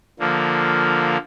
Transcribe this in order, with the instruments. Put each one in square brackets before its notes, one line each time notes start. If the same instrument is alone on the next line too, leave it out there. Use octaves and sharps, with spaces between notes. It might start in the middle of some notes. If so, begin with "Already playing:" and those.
[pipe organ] D3 F3 A#3